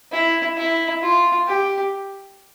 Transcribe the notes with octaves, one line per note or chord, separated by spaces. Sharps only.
E4
E4
F4
G4